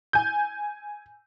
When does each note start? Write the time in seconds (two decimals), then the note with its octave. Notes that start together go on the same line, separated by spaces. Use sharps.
0.13 G#5 G6